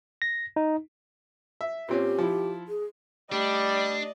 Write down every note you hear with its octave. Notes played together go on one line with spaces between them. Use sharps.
A#6
D#4
E5
A#2 C4 C#4 G4
F3 E4
G#4
G3 A3 D4 G4 D5 D#5